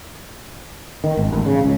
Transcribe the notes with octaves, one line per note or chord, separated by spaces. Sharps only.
D#3
G#1
A1
C#3
C#2